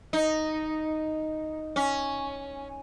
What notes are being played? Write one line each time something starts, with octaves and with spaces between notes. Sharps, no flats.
D#4
C#4